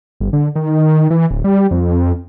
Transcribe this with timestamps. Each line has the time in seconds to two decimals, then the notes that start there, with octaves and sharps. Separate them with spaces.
0.20 G1
0.33 D3
0.56 D#3
1.10 E3
1.31 D1
1.44 G3
1.71 F2